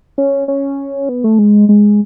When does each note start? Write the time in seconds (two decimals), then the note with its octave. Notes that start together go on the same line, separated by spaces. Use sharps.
0.18 C#4
0.48 C#4
1.09 B3
1.24 A3
1.39 G#3
1.69 G#3